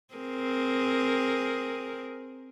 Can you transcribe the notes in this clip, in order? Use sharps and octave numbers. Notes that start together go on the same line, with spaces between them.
C4 G#4 A#4